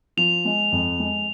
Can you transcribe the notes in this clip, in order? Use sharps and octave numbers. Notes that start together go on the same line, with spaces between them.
F3 F7
G#3
F2
G#3